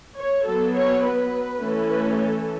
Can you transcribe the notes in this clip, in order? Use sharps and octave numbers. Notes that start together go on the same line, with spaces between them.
C#5
F#3 B3 A4
C#5
B4
E3 A3 C#4
B4
A4